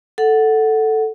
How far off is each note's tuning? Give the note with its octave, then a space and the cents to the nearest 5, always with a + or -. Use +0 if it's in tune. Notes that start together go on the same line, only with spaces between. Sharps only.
A4 +0 F#5 +0